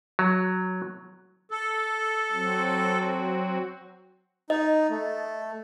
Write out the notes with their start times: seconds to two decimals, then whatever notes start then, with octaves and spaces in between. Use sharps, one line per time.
0.19 F#3
1.51 A4
2.32 F#3 C4 F#4
4.50 D#4 D#5
4.90 A3